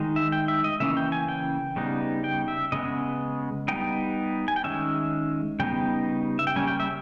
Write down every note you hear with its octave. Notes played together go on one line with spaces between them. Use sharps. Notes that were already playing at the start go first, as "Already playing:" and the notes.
Already playing: D#3 G#3 D#4
E5
G5
E5
D#5
C#3 E3 A#3 C#4 E5
G5
G#5
G5
C#3 G3 B3 D#4
G5
E5
C#3 G#3 B3 D#5
G3 B3 D#4 G5
G#5
G5
D#3 G#3 C#4 E5
C#3 G3 B3 D#4 G5
E5
G5
C#3 G3 A#3 C#4 G#5
G5
E5